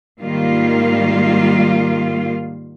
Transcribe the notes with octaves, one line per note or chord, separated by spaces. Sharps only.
G#2 D#3 G3 A#3 F4 F5